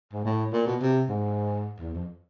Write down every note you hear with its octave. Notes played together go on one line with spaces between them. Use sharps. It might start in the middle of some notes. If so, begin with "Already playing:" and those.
G#2
A2
A#2
B2
C3
G#2
E2
F2